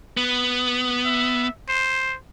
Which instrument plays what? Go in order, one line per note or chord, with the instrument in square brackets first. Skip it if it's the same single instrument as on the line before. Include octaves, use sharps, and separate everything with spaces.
[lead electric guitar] B3
[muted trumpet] E5
C5